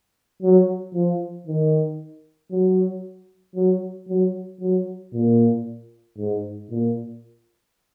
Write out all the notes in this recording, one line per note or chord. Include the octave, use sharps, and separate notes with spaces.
F#3
F3
D#3
F#3
F#3
F#3
F#3
A#2
G#2
A#2